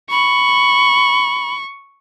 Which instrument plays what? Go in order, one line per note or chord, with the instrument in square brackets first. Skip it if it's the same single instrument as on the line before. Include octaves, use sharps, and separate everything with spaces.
[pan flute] B5 [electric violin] C#6